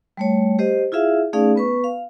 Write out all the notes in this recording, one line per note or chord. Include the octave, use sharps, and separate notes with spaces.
G3 A3 C#5
G4 C5 D#5
E4 F4 G#4 E5 F5
A3 C#4 D#4 G#4 D5 F5
B3 B4 C#6
F5